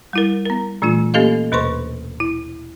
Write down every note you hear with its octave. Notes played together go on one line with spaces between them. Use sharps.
G3 E4 A#4
B3 A#4
A#2 E3 A3 D4 F4
A#3 C#4 G4 A4 D#5 F5
D#2 B2 B4 C5 C6 C#6
E4